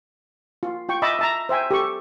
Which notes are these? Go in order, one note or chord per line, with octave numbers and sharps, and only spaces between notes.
F4
F4 G5 C#6
D#5 E5 A5 B5 D6
E5 A5 A#5
C5 E5 G5 G#5
G4 A4 C#6